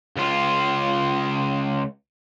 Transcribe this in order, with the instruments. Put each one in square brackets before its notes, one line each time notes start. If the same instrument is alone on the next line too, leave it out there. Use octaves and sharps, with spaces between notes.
[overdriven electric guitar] C#2 F4